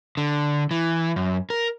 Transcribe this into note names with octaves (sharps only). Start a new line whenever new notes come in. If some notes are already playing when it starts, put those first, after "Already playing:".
D3
E3
F#2
A#4